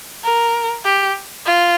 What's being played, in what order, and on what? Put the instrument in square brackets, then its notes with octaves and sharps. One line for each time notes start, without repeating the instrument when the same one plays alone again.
[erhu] A#4
G4
F4